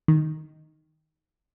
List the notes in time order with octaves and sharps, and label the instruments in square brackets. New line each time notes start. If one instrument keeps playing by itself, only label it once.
[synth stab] D#3